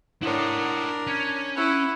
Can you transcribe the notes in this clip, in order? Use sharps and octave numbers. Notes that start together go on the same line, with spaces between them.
D4 E4 A#4 C#5 F#5 C6 D#6
C#4 G#6
E4 F#5 B5 C#6